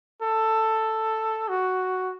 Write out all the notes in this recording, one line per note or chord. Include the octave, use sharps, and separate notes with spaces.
A4
F#4